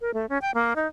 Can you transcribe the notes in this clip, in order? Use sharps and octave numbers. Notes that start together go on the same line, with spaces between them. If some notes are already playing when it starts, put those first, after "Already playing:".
A#4
A3
C#4
G5
A#3
D#4